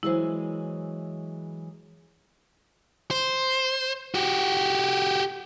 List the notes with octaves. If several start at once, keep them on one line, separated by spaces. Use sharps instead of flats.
E3 F#3 G#3 E4 C5
C5
F#4 G4